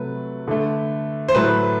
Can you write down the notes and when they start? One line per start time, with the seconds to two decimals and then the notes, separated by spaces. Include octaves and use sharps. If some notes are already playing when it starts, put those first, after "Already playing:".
Already playing: C3 F#3 A3 B4
0.48 D3 A3
1.28 C5
1.35 A2 F#3 A3 B4